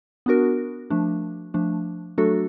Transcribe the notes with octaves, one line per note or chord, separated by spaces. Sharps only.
B3 D4 F#4 A#4
F3 A3 D4
F3 A3 D4
F#3 A3 D4 F#4 A4